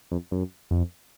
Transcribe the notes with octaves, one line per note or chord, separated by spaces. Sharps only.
F2
F#2
F2